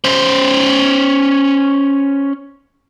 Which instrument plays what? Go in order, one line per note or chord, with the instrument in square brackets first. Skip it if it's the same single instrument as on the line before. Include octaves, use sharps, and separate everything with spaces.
[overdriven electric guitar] C#4 C5